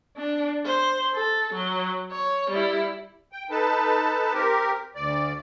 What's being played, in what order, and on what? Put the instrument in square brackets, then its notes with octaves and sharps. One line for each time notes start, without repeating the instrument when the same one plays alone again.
[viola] D4
C5
A4
F#3
C#5
G3 E4
[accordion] G5
D#4 A4 B4 A5
C4 G4 A#4
D2 D5